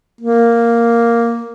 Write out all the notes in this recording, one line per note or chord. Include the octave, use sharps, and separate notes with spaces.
A#3